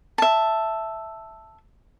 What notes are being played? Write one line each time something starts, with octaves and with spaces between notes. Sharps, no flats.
E5 A5